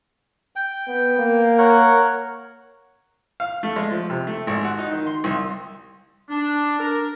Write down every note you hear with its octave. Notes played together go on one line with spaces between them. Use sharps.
G5
B3
A#3
A#4 C#5 F#5
F5
A3
G#3
F3
C3
A3
G#1
F#4
D#4
D#3
C6
C2
D4
A#4